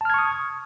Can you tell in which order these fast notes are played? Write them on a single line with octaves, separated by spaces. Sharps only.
A5 F6 G#6 C#6 D#6